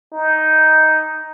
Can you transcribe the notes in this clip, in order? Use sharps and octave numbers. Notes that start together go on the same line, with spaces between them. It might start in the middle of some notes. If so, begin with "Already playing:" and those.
D#4